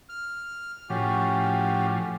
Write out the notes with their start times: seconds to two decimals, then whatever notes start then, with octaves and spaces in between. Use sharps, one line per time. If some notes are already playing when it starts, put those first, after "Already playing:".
0.09 F6
0.90 A2 F3 C#4 F#4 G4